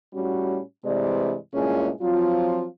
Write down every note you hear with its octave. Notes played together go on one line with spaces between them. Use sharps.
A2 G3 C#4 F#4
G2 C3 E3 G#3 D5
G2 A#2 G#3 C#4 E4 G#4
F3 F#3 C4 F4